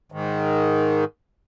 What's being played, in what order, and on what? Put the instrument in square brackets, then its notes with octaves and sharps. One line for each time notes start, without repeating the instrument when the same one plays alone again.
[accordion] G#2 D#3